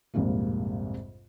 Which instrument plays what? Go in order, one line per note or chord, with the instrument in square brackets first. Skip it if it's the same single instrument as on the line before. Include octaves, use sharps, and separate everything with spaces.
[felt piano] A#1 F2 G#2 C3 G3 A#3